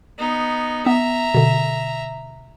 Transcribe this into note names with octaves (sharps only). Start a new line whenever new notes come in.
B3 D#4
B3 E5 A#5
B2 D3